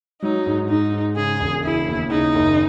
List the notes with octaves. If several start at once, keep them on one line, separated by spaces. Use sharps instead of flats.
F#3 D#4
G#2
G#2 D#4
G#2
C#3 G#4
E1
C#3 E4
D#2
C#3 D#4
F#1